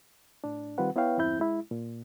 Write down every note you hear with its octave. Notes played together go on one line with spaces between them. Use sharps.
A2 D4
D#3 G3 C4 F4 B4 F#5
B3 E4 B4 C#5 F5 G5
E2 G2 C4 E4 G6
G#3 E4
A#2